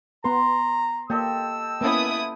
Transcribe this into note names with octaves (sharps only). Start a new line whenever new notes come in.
B3 B4 A#5 C6
A#3 G4 A4 D#5 E6
A#3 B3 C#4 E4 D#6